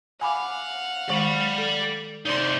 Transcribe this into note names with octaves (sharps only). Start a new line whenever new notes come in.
F5 F#5 G#5 B5 D6
D#3 G#3 D5 B5
A4
C3 D#4 D5 C6